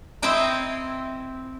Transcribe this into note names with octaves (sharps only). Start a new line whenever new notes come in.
C4 E4 C5 D#5 G5 A#5